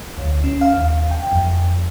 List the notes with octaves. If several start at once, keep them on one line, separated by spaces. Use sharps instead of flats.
D2
C#4
F5
D#2
G5
F2